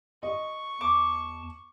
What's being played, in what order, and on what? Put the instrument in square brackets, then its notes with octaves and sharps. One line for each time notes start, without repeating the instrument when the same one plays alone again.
[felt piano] D#5 [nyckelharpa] C#6
[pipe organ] E2 A5 [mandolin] D6